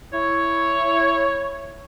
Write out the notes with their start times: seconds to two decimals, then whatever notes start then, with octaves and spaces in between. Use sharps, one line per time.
0.13 E4 C#5